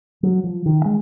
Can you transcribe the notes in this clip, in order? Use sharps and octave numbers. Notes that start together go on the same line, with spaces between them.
F#3
F3
D#3
G#3